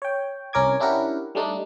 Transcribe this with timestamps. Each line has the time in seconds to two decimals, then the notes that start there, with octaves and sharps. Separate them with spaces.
0.02 C#5 G5
0.53 C2 C#4 A#4 D6 G#6
0.80 C#4 D4 E4 G4 A#4 F#5
1.35 G3 A3 D4 D#4